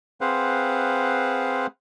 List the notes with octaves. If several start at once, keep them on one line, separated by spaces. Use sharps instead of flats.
C4 G#4 B4 C5 F5 F#5